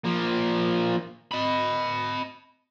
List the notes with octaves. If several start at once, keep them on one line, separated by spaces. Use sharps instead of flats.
F3 A#3
D#5 B5